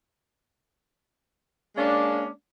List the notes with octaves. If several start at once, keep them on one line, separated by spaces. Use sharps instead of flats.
G#3 A#3 C#4 D4